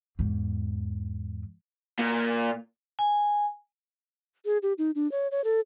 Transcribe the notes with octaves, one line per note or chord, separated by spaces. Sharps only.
E2 G#2
A#2
G#5
G#4
G4
D#4
D4
C#5
C#5
A4